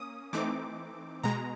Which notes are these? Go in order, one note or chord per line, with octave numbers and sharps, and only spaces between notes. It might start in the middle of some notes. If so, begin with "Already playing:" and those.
Already playing: A#3 C#4 D#6
E3 A3 C4 D#4 D6
B2 G#3 A#5